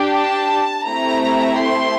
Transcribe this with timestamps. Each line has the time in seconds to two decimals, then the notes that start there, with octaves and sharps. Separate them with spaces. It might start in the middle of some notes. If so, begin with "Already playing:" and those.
Already playing: D4 G4
0.12 A5
0.88 A3 C4 E4 G4 A#5
1.64 C6